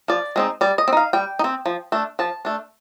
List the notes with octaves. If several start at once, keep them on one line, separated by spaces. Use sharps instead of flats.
F3 D5
G#3 C4 D#4
G3 D5
D#5
C4
D#4 F5
G3 G5
D#4
C4
F3
A3 D4
F3 A5
A3 D4